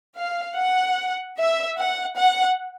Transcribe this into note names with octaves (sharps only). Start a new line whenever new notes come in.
F5
F#5
E5
F#5
F#5